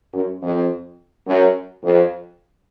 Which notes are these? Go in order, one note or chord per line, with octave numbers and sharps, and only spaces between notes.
F#2
F2
F#2
F2